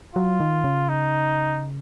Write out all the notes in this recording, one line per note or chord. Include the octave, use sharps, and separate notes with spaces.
F#3 F4
D#3
C#3
D#4